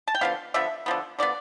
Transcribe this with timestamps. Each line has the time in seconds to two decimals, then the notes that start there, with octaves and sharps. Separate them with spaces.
0.08 A5
0.15 G5
0.21 D3 F3 B3 F5
0.54 D3 F3 B3 E5
0.86 D3 F3 B3
1.19 D3 F3 B3 D5